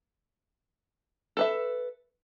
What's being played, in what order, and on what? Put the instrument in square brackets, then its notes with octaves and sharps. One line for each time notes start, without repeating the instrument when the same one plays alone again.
[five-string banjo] A4 B4 E5